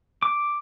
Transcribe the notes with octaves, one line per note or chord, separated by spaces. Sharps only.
D6